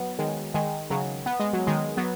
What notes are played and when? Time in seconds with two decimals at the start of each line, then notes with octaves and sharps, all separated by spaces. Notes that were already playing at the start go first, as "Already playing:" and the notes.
Already playing: F#3 B3
0.19 D#3 G#3
0.54 D#3 G#3
0.90 C#3 F#3
1.26 B3
1.40 G#3
1.53 F#3
1.67 D#3 G#3
1.97 F#3 B3